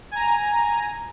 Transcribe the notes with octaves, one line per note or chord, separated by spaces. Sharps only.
G#5 A#5